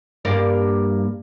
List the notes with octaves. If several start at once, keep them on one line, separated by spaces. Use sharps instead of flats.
G2 A#3 D5